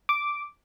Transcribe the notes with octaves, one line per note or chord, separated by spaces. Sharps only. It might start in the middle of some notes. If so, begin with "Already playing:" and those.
D6